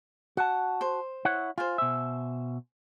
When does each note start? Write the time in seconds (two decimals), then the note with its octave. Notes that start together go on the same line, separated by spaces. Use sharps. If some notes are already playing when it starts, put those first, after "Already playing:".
0.37 F#4 F#5 A5
0.81 C5
1.25 E4 C#5 F#5
1.58 F4 C5 G#5
1.78 B2 E5